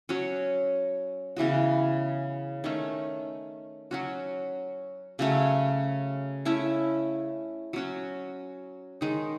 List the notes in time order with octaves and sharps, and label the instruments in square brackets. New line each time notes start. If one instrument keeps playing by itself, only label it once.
[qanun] F#3 C#4 F#4 C#5
C#3 E3 B3 F#4
D#3 A3 C#4
F#3 C#4 F#4
C#3 F#3 A3 C#4
A3 C#4 E4
F#3 C#4 F#4
D#3 G#3 D#4